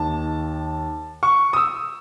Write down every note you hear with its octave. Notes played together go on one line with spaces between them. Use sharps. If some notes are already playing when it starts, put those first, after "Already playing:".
Already playing: D#2 D#3 A5
C#6
D#6
E6